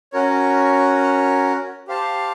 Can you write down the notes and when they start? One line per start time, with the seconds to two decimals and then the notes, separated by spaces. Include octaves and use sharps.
0.13 C#4 F#4 A#4 C#5
1.88 G4 C5 F5 A5